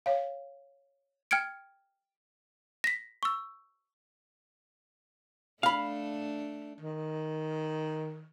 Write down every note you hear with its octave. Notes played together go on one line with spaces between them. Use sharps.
C#5 F5
G5 F6 G#6 C#7 D7
A#6 B6
C#6 E6
A3 D4 F5 B5
D#3